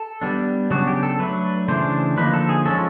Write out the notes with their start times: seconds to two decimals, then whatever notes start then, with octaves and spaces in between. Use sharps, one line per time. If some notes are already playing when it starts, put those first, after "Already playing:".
Already playing: A4
0.21 G3 B3 D4
0.70 C#3 F#3 B3 D4 F#4
0.87 G4
1.03 A4
1.19 F#3 A3 D4 B4
1.68 C#3 E3 A3 D4 C5
2.17 D3 F3 A#3 D#4 B4
2.34 A4
2.49 G#4
2.65 F3 G#3 C#4 A4